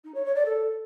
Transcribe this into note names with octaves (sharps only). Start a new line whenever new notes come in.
D#4
C#5
C#5
D5
A4